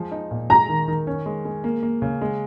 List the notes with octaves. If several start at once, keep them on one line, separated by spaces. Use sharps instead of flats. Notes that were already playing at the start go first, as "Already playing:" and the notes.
Already playing: F3 G#3
D#4
A#2
G#3 A#5
D#3
D#3
C#4
G#3
G#3
A#3
A#3
C#3
G#3